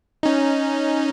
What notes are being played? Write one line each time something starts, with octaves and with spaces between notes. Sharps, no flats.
C#4 D#4